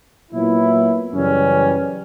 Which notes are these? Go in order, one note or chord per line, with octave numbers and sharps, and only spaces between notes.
A#2 F#3 B3 E4
F#2 C#3 E3 G3 C#4